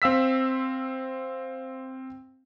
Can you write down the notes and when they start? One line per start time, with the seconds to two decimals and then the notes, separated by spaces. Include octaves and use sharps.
0.02 C4 F5 E6 B6